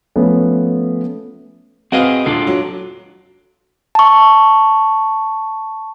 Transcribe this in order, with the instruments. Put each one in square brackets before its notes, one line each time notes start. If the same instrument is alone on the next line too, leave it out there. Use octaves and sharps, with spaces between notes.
[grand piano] F3 A3 B3 C#4
[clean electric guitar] C4 G#4 D#5 [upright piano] F#4 B4 F5
[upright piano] D#1 [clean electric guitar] D4 F4 A4
[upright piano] F#3
[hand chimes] A5 C#6